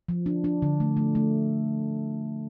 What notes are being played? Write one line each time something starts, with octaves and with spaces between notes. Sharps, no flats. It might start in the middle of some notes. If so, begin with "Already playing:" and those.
F3
D4
D4
D3
A3
A3
A3